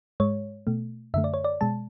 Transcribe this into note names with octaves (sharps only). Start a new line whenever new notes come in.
G#2 G#3 C#5
B2 A3
F#2 D3 A3 E5
D5
C#5
D5
B2 G#3 A5